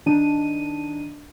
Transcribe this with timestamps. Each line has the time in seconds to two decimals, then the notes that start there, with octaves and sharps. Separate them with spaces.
0.06 D#3 D4 D#4 D#7